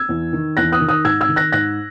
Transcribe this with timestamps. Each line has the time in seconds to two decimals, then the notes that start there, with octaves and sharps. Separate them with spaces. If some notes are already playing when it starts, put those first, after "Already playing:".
Already playing: E6 G#6
0.09 E2
0.33 D#3
0.57 E2 F#6 A#6
0.72 D#6 F#6
0.81 D#3
0.89 D#6 F#6
1.04 G#2 E6 G#6
1.21 E6 G#6
1.29 D#3
1.36 F#6 A#6
1.52 G#2 F#6 A#6